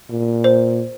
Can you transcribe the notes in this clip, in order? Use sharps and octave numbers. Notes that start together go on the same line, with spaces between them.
A#2
C5